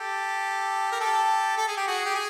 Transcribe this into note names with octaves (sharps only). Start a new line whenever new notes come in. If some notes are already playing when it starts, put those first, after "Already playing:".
Already playing: G4 A4
A#4
G4 A4
A4
G#4
G4
F#4 G#4
G4
G#4